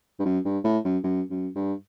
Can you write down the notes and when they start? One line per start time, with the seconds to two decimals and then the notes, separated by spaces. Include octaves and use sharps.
0.19 G2
0.25 F#2
0.45 G2
0.64 A2
0.84 F#2
1.04 F#2
1.30 F#2
1.55 G2